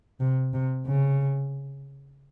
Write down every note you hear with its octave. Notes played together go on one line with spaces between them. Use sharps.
C3
C3
C#3